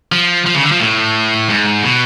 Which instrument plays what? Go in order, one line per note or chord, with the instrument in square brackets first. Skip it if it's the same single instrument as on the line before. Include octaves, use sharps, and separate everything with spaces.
[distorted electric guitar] F3
F3
C#3
D3
F3
A2
G#2
B2